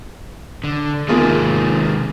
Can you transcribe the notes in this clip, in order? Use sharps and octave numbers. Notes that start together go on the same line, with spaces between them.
D3
C3 D#3 G#3 A#3 F4 G#4